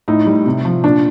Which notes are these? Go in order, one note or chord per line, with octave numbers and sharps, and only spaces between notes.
A2 D#4
G3
C3
F3
A#2 D4